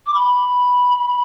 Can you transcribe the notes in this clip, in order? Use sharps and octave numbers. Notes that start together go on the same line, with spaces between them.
D6
B5